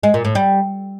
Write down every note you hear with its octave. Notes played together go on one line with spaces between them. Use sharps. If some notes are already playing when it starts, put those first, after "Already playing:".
G#3
A#2
A2
G3